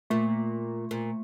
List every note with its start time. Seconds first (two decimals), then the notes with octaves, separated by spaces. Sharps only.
0.10 A#2 A3
0.91 A#2